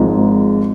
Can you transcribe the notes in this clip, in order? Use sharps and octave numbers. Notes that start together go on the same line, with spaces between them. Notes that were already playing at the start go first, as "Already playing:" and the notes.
Already playing: G#1 G#2 F3 G#3